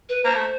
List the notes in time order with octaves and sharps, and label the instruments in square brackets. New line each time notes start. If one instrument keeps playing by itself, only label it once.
[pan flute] B4
[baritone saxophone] A#3 [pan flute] C5
[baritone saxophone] A3